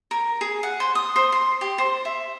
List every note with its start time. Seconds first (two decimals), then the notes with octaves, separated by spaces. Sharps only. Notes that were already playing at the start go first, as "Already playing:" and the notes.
0.11 A#4
0.41 G#4
0.63 F#5
0.80 C5
0.95 D#6
1.16 C5
1.32 C6
1.61 G4
1.78 C5
2.05 E5